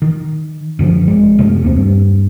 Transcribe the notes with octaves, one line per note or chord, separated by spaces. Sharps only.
D#3
F#2 D3 F3
G#1 G#3
F#2 C3 A3
D#2 G3 C4
G2